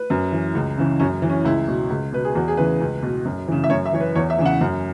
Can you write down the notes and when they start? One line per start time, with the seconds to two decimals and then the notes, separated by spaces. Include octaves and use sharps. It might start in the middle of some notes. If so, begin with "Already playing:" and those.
Already playing: B4
0.10 F#2
0.32 E3
0.55 C#2
0.78 C#3 E3
1.00 F#2 C#4
1.22 E3
1.30 C#4
1.45 C#2 E4
1.68 B2
1.90 C#2
2.13 B2 B4
2.24 G#4
2.35 E2 F#4
2.48 G#4
2.57 C#3 E3 B4
2.81 C#2
3.03 B2
3.25 F#2
3.48 C#3 E3
3.64 E5
3.70 F#2 C#5
3.86 E5
3.93 E3 C#5
4.00 B4
4.16 E2 C#5
4.30 E5
4.38 C#3 E3
4.46 F#5
4.61 F#2